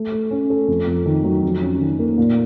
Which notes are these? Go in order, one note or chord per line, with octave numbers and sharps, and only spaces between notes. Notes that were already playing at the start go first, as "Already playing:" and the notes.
Already playing: A3
A3
C#4
A4
F2
F2
D#3
F#3
F2
C#4
D#3
A#3
A#2